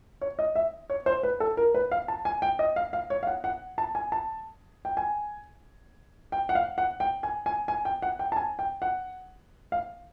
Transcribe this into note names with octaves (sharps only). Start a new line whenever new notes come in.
C#5
D#5
E5
C#5
C5
B4
A4
A#4
B4
F5
A5
G#5
G5
D#5
F5
F5
C#5
F5
F#5
F#5
A5
G#5
A5
G5
G#5
G5
F#5
F5
F#5
G5
G#5
G#5
G#5
G5
F#5
G5
A5
G#5
G5
F#5
F5